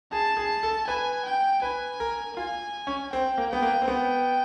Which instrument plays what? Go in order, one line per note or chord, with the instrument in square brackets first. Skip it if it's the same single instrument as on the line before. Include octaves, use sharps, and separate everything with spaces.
[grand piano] G#4 [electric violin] A5
[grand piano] G#4
A4
[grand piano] B4 [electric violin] G#5
[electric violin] G5
[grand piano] B4 [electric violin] G#5
[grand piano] A#4
[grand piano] F4 [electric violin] G#5
[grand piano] C#4
[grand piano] C4 [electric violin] G5
[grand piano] A#3
[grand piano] B3 [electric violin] G5
[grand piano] A#3
C4
[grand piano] B3 [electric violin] G5